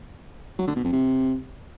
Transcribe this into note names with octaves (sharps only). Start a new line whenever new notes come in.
F#3
D3
B2
F2
C3